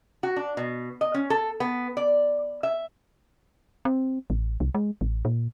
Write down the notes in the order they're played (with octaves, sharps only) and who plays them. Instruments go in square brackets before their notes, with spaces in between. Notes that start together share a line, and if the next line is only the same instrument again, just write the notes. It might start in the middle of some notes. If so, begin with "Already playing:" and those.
[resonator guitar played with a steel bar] F#4
D4
B2
D#5
C#4
A4
B3
D5
E5
[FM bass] C4
A1
C2
G#3
A1
A#2